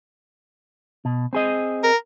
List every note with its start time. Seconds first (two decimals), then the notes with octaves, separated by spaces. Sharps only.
1.05 B2
1.33 C4 G#4 D#5
1.84 A#4